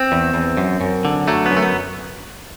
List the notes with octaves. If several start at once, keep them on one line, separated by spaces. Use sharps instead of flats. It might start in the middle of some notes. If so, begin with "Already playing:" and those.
Already playing: C4
E2
E2
F#2
F#2
D3
F#3 A3
B3
F#2
A3
B3